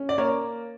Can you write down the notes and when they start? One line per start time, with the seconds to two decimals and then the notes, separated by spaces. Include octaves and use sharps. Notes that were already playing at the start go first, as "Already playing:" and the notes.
Already playing: C#4
0.09 D5
0.18 A#3 C#5